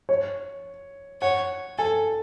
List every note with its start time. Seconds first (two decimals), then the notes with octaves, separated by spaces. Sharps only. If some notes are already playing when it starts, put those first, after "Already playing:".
0.09 C#5
1.22 C#5 F#5
1.78 A4 G#5